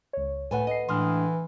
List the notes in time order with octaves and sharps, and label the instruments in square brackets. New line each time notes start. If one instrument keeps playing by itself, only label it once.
[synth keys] C#2 C#5
[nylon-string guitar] E2 A3 G#5 [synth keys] A2 [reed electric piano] A4 B4 F#5
[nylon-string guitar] D#5 [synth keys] C7 D#7
[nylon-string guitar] A2 G#3 D4 [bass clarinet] E3 [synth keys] C6 D#6 F6